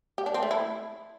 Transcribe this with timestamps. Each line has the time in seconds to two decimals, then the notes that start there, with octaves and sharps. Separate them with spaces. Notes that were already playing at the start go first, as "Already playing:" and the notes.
0.18 G4
0.26 D4
0.34 C4
0.43 A3
0.51 E4